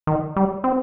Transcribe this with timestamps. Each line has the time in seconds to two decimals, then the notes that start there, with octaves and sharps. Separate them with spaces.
0.07 D#3
0.36 G3
0.64 C4